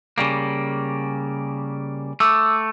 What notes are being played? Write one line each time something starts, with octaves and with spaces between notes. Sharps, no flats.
C#3 G3 A#3
A3 D6 E6